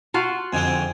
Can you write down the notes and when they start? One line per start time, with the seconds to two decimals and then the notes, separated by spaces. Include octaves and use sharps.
0.14 F4 F#4
0.53 F2 G#2 D3 C4 G#5